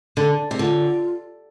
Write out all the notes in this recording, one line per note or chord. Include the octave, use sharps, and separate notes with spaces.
D3
C3
D3 F4